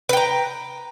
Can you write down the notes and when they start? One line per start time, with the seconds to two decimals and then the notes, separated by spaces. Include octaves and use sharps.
0.09 B4
0.13 G5
0.17 A#5